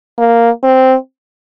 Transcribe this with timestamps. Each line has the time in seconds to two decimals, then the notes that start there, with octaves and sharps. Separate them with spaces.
0.18 A#3
0.63 C4